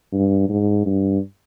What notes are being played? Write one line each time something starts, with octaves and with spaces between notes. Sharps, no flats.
G2
G#2
G2